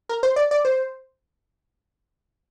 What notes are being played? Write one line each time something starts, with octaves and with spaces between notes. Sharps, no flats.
A#4
C5
D5
D5
C5